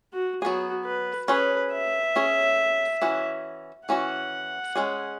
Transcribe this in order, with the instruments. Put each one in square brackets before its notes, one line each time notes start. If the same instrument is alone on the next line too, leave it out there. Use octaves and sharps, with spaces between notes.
[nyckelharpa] F#4
[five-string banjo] F#3 B3 G#4 [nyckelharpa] F#4
[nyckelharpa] B4
[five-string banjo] C#4 G#4 C#5 [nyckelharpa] B4
[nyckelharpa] E5
[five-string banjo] C#4 G#4 C#5
E3 C#4 F#4
[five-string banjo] E3 C#4 F#4 [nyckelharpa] F#5
[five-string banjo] G#3 C#4 G#4